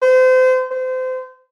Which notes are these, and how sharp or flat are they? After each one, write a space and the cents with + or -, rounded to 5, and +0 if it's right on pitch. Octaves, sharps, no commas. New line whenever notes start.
C5 -30
C5 -30